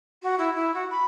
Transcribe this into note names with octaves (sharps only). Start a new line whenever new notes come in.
F#4
E4
E4
F#4
B5